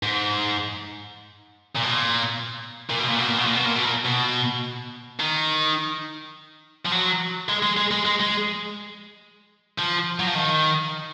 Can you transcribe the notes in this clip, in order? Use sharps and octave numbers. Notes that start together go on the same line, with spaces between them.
G#2
A#2
B2
A#2
A#2
B2
A#2
B2
A#2
B2
A#2
B2
A#2
B2
A#2
B2
D#3
F3
F#3
G#3
G#3
G#3
G#3
G#3
G#3
F3
F#3
F3
D#3